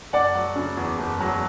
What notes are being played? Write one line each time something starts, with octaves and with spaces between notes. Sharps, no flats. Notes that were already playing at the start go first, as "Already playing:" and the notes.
F#1 D5 F#5
F#3
C#3
E2
F#1
F#3